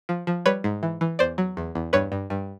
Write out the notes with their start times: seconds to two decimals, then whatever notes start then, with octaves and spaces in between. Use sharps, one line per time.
0.09 F3
0.27 F3
0.46 G3 B4 C#5
0.64 G#2
0.83 E3
1.01 E3
1.19 E2 C5 D5
1.38 F#3
1.57 E2
1.75 E2
1.93 G2 B4 C#5
2.12 G2
2.30 G2